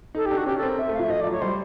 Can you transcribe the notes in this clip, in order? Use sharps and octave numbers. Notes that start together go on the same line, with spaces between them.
D#4 A4
G4
D4
F#4
C#4 G4
A4
C4
A#4
E5
A3
F3 F5
E5
F3 D#5
F#3 D5
C#5
G3 C5